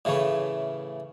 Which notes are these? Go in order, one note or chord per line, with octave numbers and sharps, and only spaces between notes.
A2 C#3 E3 A3 C#4